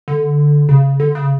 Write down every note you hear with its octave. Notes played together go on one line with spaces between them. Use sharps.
D3
C#3
D3
C#3